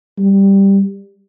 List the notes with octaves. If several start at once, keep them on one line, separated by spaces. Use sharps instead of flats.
G3